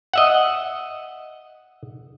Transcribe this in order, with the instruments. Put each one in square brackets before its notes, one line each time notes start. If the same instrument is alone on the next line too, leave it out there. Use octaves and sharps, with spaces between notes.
[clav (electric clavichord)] D#5 E5 F#5